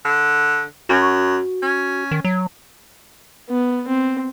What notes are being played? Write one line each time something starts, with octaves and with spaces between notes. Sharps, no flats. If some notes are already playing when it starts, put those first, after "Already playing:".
D3
F#2 F#4
C#4
D#3
F#3
B3
C4